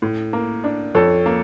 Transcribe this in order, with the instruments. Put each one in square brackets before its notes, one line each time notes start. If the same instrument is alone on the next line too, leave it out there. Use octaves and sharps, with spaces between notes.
[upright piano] A2
A#3
D4
[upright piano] F2 [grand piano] A4 C#5
[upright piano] A#3